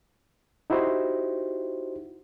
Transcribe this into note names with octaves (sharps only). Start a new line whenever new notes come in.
D#4 E4 F#4 G4 C5